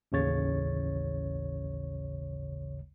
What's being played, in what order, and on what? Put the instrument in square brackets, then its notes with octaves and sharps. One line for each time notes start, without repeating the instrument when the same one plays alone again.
[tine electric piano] A1 D#2 C#3 C#5 A6